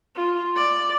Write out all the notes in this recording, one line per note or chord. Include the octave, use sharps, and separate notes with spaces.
F4
D5